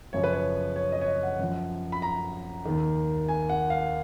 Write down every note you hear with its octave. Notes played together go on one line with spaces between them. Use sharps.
F#2 C#3 F3 C#5
B4
C#5
C#5
D#5
C#5
D#5
F#5
F#2 F3
B5
A#5
D#2 D#3
G#5
F#5
F5